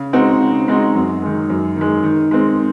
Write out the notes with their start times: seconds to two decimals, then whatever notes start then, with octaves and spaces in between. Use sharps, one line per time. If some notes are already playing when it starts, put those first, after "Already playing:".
Already playing: C#3
0.13 G#3 C4 D#4 F#4
0.40 C#3
0.68 G#3 C4 D#4 F#4
0.95 F#2
1.22 D#3 G#3
1.49 F#2
1.76 D#3 G#3
2.03 D#3
2.31 G#3 C4